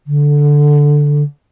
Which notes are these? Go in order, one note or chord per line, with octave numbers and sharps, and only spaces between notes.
D3